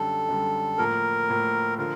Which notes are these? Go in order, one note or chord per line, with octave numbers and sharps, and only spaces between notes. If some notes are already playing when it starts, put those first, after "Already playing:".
Already playing: F#2 D3 G3 A4
F#2 D3 G3
A2 F3 A#3 A#4
A2 F3 A#3
D3 F3 A#4